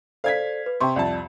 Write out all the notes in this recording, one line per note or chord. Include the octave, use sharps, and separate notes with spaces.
A4 C5 D5 F5 G#6 B6
B4
C3 G5 C6 C#6
C2 F2 D5 A5